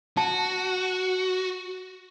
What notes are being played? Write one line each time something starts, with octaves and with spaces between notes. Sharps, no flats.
F#4 A5